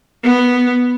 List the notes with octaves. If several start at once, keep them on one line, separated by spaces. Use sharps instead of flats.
B3